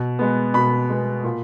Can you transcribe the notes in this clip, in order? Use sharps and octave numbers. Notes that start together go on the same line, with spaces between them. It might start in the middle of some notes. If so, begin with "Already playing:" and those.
Already playing: B2
G#3 B3
B2 B5
G#3 B3
A#2